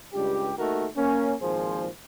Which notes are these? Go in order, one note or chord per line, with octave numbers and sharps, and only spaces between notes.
C#2 G2 G3 G4
D#2 D#3 A3 F#4 A#4
A#3 C#4
G#1 A#2 F3 G#4 C5